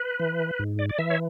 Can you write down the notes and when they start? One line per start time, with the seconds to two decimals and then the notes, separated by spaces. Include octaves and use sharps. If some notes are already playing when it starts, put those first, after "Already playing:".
Already playing: B4
0.19 E3
0.59 G#2
0.79 D5
0.89 D5
0.99 E3 E5
1.10 C#5